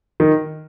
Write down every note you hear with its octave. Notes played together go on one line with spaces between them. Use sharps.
D#3